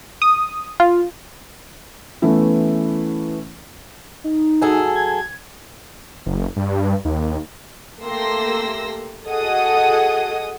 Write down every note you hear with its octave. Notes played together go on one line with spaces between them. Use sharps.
D#6
F4
E3 A3 B3 C#4 E4
D#4
F#2 G#4 A4
G#6
F#1
G2
D#2
A3 A#3 G4 C6 E6 A#6
F#4 G#4 A4 D#5 F#5 D#6